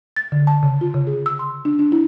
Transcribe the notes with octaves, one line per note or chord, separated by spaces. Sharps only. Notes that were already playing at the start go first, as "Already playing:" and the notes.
A6
D3
A5
C#3
F4
C#3
G#4
E6
C6
D4
D4
E4